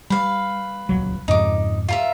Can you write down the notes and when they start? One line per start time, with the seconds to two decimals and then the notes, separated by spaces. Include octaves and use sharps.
0.10 G3 B4 F5
0.89 D#1 C#2 F#3
1.28 F2 G#2 C#3 D#4 D6
1.89 F4 A#4 E5